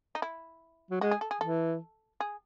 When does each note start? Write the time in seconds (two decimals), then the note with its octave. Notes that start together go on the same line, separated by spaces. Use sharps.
0.15 D#4
0.22 E4
0.91 F#3
1.01 G#3 F#4
1.11 G#4
1.21 A4
1.31 G#4
1.41 E3 A4
2.20 G#4